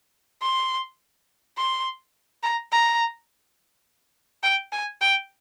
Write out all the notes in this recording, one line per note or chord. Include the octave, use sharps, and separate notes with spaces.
C6
C6
A#5
A#5
G5
G#5
G5